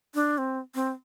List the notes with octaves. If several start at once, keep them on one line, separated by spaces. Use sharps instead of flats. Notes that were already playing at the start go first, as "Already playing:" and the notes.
D4
C4
C4